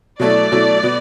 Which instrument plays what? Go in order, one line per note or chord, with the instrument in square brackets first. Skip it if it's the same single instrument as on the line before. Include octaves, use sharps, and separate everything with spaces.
[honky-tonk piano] B2 F#3 A3 E4 A4 [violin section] D5
[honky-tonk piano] B2 F#3 A3 E4 A4
B2 B3